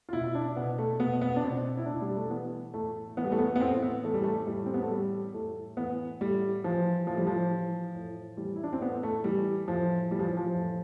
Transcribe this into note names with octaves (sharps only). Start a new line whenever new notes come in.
F4
B2 E4
D4
B2 B3
A3
B2 B3
B3
D4
B2 C4
E4
B2 D4
G3
A3
E3 B3
A2 A3
E3 B3
G3
A3
B3
B3
A2 C4
B3
E3 A3
G3
A3
A2 G3
C4
B3
A3
E3 G3
A2 A3
E3 B3
A2 G3
E3 F3
A2 F3
G3
F3
E3
A2
E3 G3
E4
D4
C4
A2 B3
A3
E3 G3
A2 F3
E3 G3
F3
F3
A2